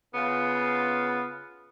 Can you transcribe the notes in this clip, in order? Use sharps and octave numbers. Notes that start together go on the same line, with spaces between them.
C#3 B3 F4